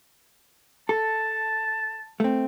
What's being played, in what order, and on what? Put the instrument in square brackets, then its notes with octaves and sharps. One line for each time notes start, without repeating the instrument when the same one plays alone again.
[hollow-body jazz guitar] A4 [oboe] A5
[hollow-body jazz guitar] A3 C4